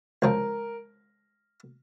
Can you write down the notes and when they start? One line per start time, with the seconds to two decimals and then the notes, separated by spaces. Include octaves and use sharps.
0.22 C#2 C#3 F3 A#4